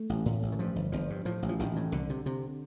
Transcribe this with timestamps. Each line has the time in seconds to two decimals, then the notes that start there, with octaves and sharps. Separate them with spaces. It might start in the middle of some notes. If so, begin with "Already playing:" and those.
Already playing: A3
0.09 A1
0.26 A2
0.43 A1
0.52 D#3
0.59 G2 F3
0.76 G1
0.92 G1 F3
1.10 G2
1.25 A2 F3
1.42 A1
1.49 F3
1.59 A1 D#3
1.76 A2
1.92 C2 D3
2.10 C3
2.26 C3